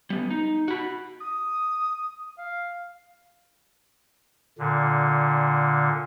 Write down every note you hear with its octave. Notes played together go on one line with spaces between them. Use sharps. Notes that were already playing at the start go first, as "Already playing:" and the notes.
G3 B3
D#4
F#4 B5
D#6
F5
A#2 D3